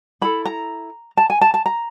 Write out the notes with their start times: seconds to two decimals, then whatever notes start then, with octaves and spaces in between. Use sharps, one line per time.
0.21 E4 A4 B5
0.45 A#5
1.17 A5
1.30 G#5
1.41 A5
1.54 A5
1.66 A#5